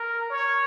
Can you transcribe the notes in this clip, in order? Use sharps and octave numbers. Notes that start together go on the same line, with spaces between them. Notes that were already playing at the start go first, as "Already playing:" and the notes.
Already playing: A#4
C#5